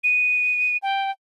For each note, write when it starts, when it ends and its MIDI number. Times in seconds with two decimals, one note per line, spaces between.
0.04 0.77 99
0.83 1.11 79